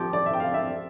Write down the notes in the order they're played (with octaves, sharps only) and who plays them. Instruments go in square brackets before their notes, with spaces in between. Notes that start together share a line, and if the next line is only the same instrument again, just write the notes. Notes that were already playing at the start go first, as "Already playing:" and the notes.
Already playing: [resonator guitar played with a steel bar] F3 G4 [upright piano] D6
[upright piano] D5
E5
G5
F5
E5